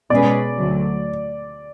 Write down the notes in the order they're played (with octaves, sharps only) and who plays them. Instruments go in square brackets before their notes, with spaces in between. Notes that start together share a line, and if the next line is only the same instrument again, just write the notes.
[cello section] B2 G#3 C#4 G#4 B4 [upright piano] D5
[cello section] D2 D3 F#3